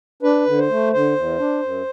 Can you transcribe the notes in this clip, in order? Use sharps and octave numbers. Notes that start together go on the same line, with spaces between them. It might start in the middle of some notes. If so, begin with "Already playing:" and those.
D4 B4
D3
C5
A3
D3 C5
E2
D4
F#2